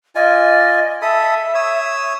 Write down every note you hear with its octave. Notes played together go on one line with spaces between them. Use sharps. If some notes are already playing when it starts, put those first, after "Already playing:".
F4 D5 D#5 G#5
A4 E5 B5 D#6
C#5 D#6 E6